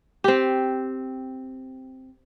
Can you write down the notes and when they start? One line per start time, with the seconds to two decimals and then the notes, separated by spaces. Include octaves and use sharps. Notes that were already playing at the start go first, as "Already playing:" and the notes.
0.24 C4 G4